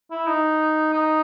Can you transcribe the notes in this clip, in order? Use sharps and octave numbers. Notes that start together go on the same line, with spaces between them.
E4
D#4
D#4